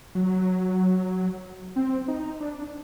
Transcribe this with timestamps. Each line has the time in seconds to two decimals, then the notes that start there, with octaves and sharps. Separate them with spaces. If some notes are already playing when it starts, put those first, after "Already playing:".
0.15 F#3
1.76 C4
2.08 D#4
2.40 D4